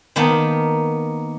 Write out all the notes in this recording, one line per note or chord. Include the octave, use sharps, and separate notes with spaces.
D#3 A#3 B3 A5